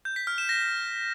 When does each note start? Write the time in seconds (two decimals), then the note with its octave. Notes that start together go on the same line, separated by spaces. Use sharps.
0.05 G6
0.16 B6
0.27 F6
0.38 E7
0.49 A#6